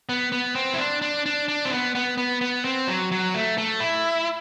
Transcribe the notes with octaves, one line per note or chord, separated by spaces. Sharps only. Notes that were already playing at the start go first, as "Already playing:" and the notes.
B3
B3
C4
E4
D4
D4
D4
D4
C4
B3
B3
B3
B3
C4
F#3
F#3
A3
A3
E4